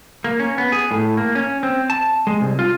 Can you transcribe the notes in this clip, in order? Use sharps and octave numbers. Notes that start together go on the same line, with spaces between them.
A#3
C#4
B3
G#4
A2
A#3
C#4
C4
A5
G#3
C2
F4